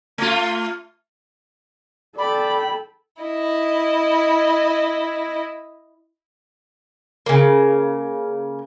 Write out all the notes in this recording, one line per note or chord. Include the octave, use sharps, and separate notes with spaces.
A3 F4
A4 D5 G5 B5
E4 D#5
C#3 A#3